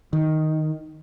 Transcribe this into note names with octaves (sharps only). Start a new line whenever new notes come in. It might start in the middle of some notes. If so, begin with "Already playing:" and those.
D#3